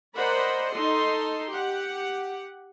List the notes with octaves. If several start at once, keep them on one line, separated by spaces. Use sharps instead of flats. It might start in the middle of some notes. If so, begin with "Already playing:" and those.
A#4 C5 D5 D#5 F#5 B5
D#4 A4 C6
G4 F#5